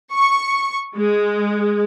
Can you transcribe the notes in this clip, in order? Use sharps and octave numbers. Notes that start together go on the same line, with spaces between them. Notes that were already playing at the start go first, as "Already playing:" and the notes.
C#6
G#3